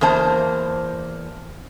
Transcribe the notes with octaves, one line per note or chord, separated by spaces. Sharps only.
E2 A#3 C5 A5